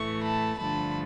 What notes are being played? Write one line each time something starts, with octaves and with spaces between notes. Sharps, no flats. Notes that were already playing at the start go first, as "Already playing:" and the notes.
Already playing: A2 E3 A3 C#6
A5 B5
G2 D3 F3 A3 A5 B5